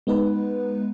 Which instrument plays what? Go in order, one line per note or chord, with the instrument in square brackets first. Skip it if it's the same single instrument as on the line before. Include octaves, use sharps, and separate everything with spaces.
[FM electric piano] G#3 B3 D#4 B4